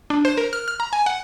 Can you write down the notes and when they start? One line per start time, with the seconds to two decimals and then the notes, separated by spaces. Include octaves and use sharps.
0.10 D4
0.25 C5
0.37 A#4
0.53 F6
0.68 F6
0.80 A#5
0.93 G#5
1.06 F#5